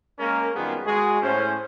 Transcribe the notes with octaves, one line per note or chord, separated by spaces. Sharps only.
G#3 A#3 C#4 A#4
F#2 D#3 G3 B3 F4 G#4
G#3 F#4 G#4
A2 C#4 C5